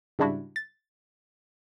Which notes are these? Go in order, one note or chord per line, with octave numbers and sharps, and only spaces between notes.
G#2 C#3 G3 D4 E4 F#4
A6